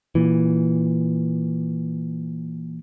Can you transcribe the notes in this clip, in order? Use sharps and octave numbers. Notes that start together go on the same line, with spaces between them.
A#2 E3